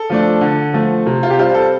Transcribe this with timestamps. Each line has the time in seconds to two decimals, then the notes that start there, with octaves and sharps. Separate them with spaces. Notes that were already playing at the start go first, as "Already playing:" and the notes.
Already playing: A4
0.10 F3 A3 D4
0.41 D3
0.74 F3 A3
1.06 C3
1.23 F4
1.30 G4
1.38 G3 C4 F4
1.54 A4